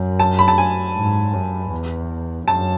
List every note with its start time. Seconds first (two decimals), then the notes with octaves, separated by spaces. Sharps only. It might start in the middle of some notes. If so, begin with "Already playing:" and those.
Already playing: F#2
0.19 A5
0.39 B5
0.48 A5
0.58 G#5
0.96 G#2
1.33 F#2
1.72 E2
2.47 F#2 A5